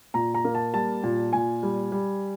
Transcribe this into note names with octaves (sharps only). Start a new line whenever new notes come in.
A#2 A#5
A#5
A#3
A5
G3 A5
A#2
A#2 G#5
G3
G3